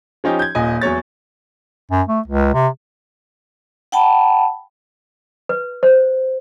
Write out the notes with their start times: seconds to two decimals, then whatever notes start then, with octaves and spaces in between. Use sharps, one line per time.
0.24 F3 C#4 D#4 G4
0.39 G6 G#6
0.55 D#1 F4 D#5 G#5
0.82 E2 F#3 C#5 A6
1.92 F#2
2.09 A3
2.28 C#2
2.54 C3
3.92 F#5 G5 A5 B5
5.49 B4
5.83 C5